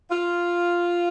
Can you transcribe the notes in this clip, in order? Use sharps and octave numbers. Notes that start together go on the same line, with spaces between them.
F4